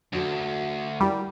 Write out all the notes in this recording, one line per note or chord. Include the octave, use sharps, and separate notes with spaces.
D2 D4 F#4 A4
G3 E4 G4 A#4